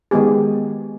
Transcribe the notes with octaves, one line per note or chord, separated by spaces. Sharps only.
D#3 G#3 B3 G4 G#4